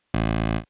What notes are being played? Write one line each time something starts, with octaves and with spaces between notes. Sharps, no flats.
A1